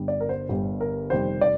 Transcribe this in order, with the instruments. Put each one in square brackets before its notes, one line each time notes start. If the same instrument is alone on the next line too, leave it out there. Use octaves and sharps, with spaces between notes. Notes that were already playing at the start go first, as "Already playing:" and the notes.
Already playing: [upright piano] G1 G2 D3 G3
D5
A#4
C5
G1 G2 D3 G3
A#4
F1 F2 D#3 G3 C5
D5